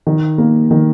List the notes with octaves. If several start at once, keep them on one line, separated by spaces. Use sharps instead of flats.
D#3
A#3
D#3